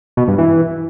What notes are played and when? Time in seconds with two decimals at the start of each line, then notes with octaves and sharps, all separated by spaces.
0.17 B2
0.28 G2
0.38 E3